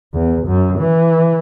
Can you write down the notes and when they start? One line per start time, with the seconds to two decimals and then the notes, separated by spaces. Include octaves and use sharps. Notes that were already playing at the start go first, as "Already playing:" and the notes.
0.14 E2
0.47 F#2
0.79 E3